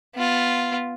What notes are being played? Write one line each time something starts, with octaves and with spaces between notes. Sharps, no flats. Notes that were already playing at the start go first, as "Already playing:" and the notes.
B3 F4